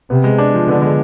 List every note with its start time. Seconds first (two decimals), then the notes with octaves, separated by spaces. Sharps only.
0.10 C3 B3
0.24 G#3
0.38 D4
0.54 F3
0.68 D3 B3
0.82 G#3